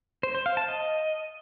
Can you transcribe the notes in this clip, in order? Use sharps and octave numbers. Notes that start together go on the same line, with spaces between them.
C5
C5
F5
A5
D#5